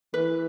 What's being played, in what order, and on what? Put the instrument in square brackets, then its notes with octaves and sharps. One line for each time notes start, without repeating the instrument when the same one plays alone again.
[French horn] E3 [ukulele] B4